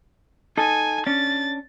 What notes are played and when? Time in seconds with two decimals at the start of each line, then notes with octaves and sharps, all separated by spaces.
0.57 D#4 A4 G#5
1.06 C#4 D4 A6